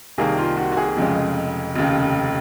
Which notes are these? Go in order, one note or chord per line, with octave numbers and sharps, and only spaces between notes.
C2 C3 D#3 A#3 G#4
F4
F#4
F#4
G#4
F1 F2 C#3 G#3
F1 D#2 C#3